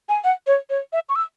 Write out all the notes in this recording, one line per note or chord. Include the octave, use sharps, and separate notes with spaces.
G#5
F#5
C#5
C#5
E5
C#6
E6